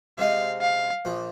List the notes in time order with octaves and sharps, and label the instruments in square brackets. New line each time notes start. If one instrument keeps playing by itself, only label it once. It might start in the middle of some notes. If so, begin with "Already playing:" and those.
[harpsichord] C3 G#3 C4 D#4 [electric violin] F5
[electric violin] F5
[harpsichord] A#1 A#2 F3